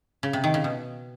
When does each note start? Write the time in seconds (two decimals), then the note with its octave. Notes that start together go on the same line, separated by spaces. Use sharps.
0.23 C#3
0.33 C3
0.44 D#3
0.54 C#3
0.64 B2